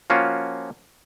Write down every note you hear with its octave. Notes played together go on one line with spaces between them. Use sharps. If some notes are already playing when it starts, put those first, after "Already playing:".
F3 A#3 C#4 F4 F#4